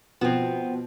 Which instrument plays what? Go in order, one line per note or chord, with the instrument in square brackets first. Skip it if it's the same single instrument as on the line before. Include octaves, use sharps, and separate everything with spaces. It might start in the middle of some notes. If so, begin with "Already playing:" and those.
[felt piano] B2 F3 [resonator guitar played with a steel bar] B3 C4